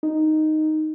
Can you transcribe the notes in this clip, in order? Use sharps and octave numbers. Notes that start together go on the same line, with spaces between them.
D#4